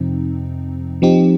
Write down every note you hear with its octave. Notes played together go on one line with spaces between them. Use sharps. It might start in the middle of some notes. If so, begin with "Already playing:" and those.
Already playing: F2 C3 F3 C4 D#4
F3 C4 D#4 G4